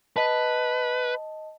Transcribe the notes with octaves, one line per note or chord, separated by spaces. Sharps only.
B4 D#5 A5